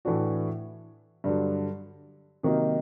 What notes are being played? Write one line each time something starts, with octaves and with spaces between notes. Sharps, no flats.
A2 E3 A3 D4 F#4
G2 D3 F#3
C3 D#3 F#3 A#3 D#4